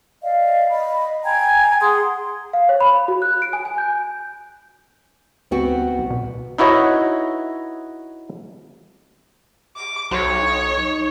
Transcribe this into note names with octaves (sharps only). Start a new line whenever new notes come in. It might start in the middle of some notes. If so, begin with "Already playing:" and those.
D5 D#5 F5
D#5 B5
G5 G#5 A#5 G#6
G#4 F#5 C6 D#6
F5
C#5
B5
F#4
F#6
D7
G#5
G#5
G6
D2 B3 C4 F#4
C2
B2
D#4 E4 F#4 B4 C#5 D#5
D6
B1 F#4 C#5
D#4